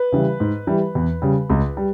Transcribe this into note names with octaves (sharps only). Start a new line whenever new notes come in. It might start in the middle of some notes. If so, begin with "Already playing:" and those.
Already playing: B4
C#3 E3 G3
G#2
E3 G3
E2
C#3 G3
C#2
G3